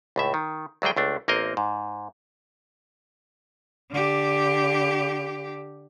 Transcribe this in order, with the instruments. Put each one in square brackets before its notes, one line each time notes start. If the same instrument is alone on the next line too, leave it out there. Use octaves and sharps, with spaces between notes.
[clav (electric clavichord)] C#2 A2 E5
D#3
D2 F#3 G3 G#4 G5
C#2 A3 D4
A1 A#3 C4 A#4 D#5
G#2
[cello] D3 G4